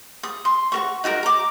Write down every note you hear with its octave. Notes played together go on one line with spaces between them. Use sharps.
D#6
C6
F#4 A#4 C#6
D#4 F#4 A4 A#4
A#5 D6